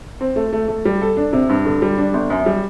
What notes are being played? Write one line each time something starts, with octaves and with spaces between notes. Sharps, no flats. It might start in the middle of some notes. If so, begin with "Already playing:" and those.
C4
A3
A3
A3
G3
A4
D4
C3
G2
D3
G3
D4
G1
F#2
G3